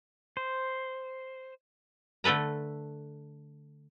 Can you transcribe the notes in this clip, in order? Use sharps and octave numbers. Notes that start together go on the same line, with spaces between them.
C5
D3 A3 A4 B4 A#5